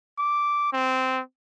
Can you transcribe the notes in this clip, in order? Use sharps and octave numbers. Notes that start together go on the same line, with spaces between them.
D6
C4